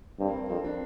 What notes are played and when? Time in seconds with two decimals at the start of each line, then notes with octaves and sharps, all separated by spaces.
0.19 G2 C4
0.27 A#3
0.34 C4
0.49 F2 C4
0.64 D4